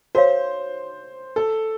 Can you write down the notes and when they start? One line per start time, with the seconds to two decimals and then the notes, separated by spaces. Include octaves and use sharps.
0.15 F#4 A#4 C5 C#5 F5
1.36 A4